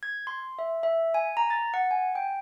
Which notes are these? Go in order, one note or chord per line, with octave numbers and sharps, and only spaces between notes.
G#6
C6
E5
E5
G#5
A#5
A6
F#5
G#5
G5